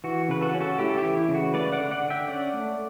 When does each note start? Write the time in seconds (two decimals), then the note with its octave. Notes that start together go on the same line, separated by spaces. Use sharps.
0.04 E3 F#4
0.29 C#3 B4
0.41 F#4 A4
0.54 C#4
0.61 F#4 A4
0.79 A3 E4 G4
0.89 A4
0.97 E4 G4
1.04 E3
1.17 E4
1.29 C#3
1.35 F#4
1.54 A3 B4 D5
1.72 D5 F#5
1.80 D3
1.91 D5 F#5
2.03 D3
2.10 E5 G5
2.28 C#4 D5 F#5
2.53 A3